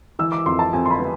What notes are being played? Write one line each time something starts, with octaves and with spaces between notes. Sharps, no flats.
E3 E6
D6
F2 C6
A5
F2 G#5
C6
B5
B3